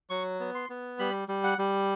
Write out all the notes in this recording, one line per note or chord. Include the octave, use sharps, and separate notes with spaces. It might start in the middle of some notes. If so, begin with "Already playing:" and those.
F#3 C#6
B3
C6
B3
G3 B5
G3
F#5
G3